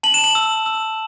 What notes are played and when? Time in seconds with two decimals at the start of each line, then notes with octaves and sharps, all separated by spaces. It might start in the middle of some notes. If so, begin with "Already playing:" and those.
0.03 A5 F#7
0.14 E7
0.24 F#7
0.35 E6
0.66 E6